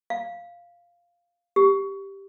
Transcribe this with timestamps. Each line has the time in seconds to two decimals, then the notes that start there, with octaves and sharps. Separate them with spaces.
0.10 F5
1.56 G4